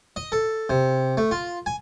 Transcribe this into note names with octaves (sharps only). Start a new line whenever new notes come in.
D#5
A4
C3
A3
F4
G#5